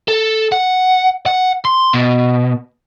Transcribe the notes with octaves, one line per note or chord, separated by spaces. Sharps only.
A4
F#5
F#5
C6
B2